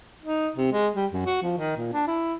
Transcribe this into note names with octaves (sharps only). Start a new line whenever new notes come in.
D#4
C3
G#3
G3
F#2
F#4
F3
D#3
A#2
D4
E4